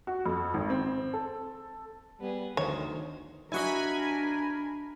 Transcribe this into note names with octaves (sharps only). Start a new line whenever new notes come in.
F#4
F2
G#1
C4
A4
G3 B3 G#4
D2 D#3 C5 C#5
D4 E4 F#4 A#4 D#5 G#5 B5